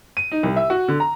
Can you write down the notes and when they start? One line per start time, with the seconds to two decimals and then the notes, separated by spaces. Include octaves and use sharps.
0.17 D#7
0.32 D#4
0.43 C2
0.56 E5
0.70 F#4
0.88 D3
1.00 A#5